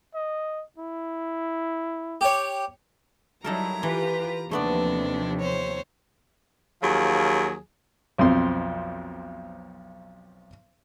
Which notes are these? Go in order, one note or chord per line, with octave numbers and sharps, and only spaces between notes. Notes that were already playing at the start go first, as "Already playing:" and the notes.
D#5
E4
G4 C#5
F#3 G3 D#4 E4 A4 A#4 A#5
E3 F4 G4 B4
D#2 C3 F3 A3 B3 D4 D5
C5 C#5
D#2 F3 F#3 G#4
B1 F2 C4 C6